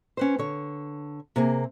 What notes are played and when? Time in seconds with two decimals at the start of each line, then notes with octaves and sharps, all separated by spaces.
0.17 C#4 B4 C5
0.39 D3 C#5
1.36 C3 A#3 G#4